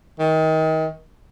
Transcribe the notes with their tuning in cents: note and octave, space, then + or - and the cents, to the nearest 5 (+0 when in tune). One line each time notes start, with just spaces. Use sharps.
D#3 +30